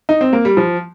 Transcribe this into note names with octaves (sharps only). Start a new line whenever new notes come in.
D#4
C4
A#3
G3
F3